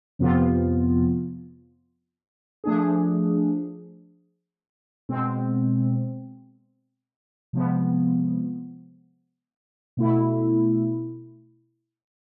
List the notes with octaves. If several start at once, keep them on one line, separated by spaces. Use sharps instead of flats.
F2 C3 F3 B3 F4
F3 A3 D4 G#4
B2 G#3 C4
C3 F3 G#3 B3
B2 A3 E4